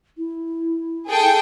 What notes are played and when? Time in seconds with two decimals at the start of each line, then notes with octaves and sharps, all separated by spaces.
0.18 E4
1.09 G#4 A4 G5